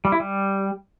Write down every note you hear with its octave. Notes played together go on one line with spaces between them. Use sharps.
G3
E4
G3